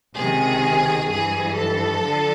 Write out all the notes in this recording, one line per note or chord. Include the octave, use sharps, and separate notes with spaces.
C#2 C3 D#3 G#4
G2 E3 G#4
A4
D3 F3